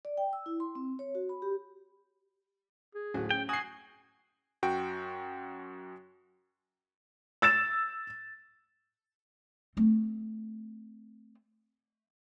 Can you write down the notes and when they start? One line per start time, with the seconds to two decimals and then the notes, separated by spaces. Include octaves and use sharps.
0.05 D5
0.18 G5
0.33 E6
0.46 E4
0.60 C6
0.75 C4
0.99 C#5
1.15 F#4
1.29 B5
1.42 G4
2.95 G#4
3.14 D1 F#4
3.31 C#4 G5
3.49 F#4 G#5 D#6 C7
4.63 F#2 F#4 G5 D7
7.42 E6 A6 E7
9.77 A3 C4